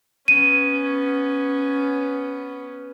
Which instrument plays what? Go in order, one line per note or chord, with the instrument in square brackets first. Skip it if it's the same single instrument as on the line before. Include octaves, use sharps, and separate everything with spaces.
[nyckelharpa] B3 C#4 [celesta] D#7